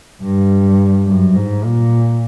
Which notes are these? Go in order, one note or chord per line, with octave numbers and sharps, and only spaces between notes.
G2
F#2
G#2
A#2